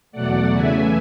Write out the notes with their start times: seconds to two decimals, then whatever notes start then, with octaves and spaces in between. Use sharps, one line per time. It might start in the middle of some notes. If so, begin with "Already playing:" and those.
0.12 E2 B2 F#3 A3 D5 F#5
0.52 E2 C#3 E3 A3 E5 G#5